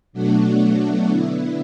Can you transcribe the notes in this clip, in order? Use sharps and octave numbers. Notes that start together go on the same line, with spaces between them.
B2 F#3 A3 D4 F#4
D3 B3 E4